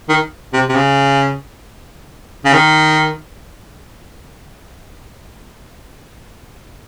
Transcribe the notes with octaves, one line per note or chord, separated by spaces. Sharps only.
D#3
C3
C3
C#3
C#3
D#3